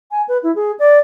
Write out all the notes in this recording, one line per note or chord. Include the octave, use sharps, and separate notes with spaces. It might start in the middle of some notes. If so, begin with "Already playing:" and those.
G#5
B4
E4
G#4
D5